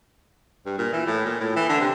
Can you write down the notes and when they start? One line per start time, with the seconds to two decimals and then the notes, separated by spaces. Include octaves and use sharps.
0.66 G2
0.78 A#2
0.93 E3
1.07 A2
1.26 A#2
1.40 A2
1.56 E3
1.69 D3
1.81 C3